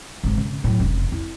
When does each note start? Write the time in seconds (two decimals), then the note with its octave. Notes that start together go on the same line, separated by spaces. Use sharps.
0.23 G#1 G#2
0.38 C#3
0.64 A2 F#3
0.80 F1 C#3
1.12 E4